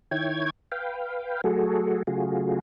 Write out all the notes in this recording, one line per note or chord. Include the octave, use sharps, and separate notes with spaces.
D#3 E4 C#5 G5 G#6
B4 F5 G5
F#3 A3 F#4 G#4 A4
C#3 F#3 A3 F4 F#4 G#4